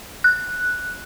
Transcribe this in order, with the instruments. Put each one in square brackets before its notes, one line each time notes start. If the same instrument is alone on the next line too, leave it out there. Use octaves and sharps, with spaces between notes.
[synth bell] F#6